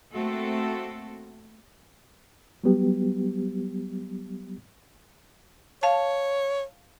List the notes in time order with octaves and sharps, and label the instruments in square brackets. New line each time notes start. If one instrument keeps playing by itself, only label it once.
[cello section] A3 A#3 C4 F#4 A4
[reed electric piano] F#3 G3 B3 G4
[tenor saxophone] C#5 [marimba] F5 A5